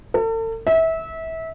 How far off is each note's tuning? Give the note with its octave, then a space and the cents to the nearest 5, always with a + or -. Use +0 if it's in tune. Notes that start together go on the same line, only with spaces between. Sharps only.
A4 +40
E5 -25